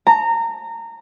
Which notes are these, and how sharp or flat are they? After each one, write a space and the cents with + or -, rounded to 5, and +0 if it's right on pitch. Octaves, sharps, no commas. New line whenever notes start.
A#5 -25